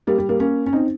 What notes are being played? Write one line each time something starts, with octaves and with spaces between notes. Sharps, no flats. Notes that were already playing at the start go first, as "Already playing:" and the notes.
G3 A#3
G3
G3 A#3
A#3 C#4
C#4
C4 D#4